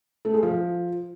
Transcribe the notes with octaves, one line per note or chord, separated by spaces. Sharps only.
A3
G#3
F3